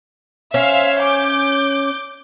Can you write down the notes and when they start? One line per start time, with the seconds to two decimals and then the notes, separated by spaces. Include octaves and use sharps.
0.54 C#4 C5 E5 F5
1.01 D6 G6